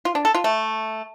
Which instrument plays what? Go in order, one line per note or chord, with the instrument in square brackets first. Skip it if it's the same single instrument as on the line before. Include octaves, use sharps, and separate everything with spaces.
[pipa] F4
D4
A4
F4
A3